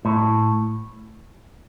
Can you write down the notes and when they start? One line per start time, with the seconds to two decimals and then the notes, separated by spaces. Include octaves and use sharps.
0.05 A2